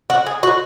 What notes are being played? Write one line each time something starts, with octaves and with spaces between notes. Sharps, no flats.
F#4
G#4
F#4